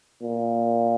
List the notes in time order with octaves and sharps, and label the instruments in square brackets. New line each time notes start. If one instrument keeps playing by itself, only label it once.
[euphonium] A#2